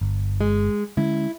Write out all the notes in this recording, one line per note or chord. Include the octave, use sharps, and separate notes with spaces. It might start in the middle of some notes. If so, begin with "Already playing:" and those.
G1
G#3
D3 G#3 C#4 E4